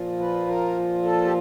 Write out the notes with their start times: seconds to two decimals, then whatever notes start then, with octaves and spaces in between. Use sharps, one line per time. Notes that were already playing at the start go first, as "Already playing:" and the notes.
Already playing: A#2 F3
0.19 B4
0.47 A#4
1.03 A4
1.24 G4